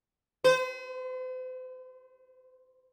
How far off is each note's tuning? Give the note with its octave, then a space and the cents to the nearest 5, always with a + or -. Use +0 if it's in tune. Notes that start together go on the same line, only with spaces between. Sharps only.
C5 -40